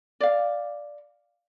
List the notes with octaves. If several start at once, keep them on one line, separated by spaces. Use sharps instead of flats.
D5 F5